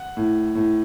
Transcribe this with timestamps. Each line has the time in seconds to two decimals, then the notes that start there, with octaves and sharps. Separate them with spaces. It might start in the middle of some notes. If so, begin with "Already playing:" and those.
Already playing: F#5
0.17 A2
0.55 A2